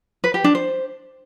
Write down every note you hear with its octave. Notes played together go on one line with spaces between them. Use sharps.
B4
G4
D4
C5